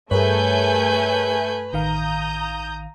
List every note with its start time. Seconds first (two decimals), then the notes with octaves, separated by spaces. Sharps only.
0.11 G2 A3 G#4 A#4 B4 C#5 G#5 G6
1.73 A1 D#3 F5 A#5 D#6 G6